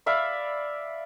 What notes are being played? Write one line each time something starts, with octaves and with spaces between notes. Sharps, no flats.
D5 E5 F5 B5